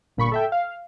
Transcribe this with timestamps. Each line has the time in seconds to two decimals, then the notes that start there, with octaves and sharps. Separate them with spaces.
0.17 G1 A#2 B5 C#6
0.32 A4 E5 G5
0.52 F5